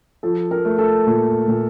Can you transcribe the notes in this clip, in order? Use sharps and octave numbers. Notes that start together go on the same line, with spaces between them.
F3 A4
A#4
A3
A4
A#2
A#2